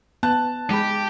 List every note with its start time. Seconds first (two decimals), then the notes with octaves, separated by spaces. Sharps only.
0.23 B3 A5 F#6
0.71 G#3 G4 B5